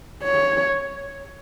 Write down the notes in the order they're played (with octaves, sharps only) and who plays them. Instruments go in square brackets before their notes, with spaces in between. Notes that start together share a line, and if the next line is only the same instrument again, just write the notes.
[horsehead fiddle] C#5